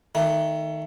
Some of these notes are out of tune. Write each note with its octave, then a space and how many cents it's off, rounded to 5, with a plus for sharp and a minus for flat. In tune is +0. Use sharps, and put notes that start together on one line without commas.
D#3 +0 A3 +25